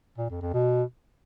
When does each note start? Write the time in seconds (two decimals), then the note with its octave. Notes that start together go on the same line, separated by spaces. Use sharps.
0.18 A#2
0.30 F2
0.42 F2
0.53 B2